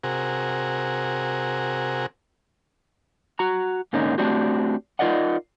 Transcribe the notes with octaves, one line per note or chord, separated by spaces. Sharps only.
C3 F#4 G#4 A#4
F#4 A#5
G#2 D3 A#3 C#4 D#4
A3 C4 D4 F#4 G4
D#4 F4 A#4 D5 D#5 F#5